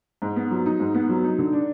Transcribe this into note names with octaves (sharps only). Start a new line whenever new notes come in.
G#2
B3
F#3
D#4
G#2
B3
F#3
D#4
D3
D4